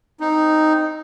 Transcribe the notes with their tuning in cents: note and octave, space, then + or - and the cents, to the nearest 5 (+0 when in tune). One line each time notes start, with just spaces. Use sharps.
C4 +0 D#4 +0